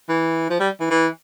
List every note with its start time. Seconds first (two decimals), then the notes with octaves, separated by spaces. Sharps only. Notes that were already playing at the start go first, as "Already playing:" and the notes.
0.09 E3
0.50 F3
0.60 G3
0.80 E3
0.91 E3